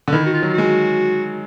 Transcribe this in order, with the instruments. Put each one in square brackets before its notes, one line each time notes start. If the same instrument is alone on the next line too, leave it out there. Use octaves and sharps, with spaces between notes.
[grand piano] D3
[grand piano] D#3 [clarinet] E4
[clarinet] F#4
F4
[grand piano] F#3
[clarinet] F4
F#4
[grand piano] G#3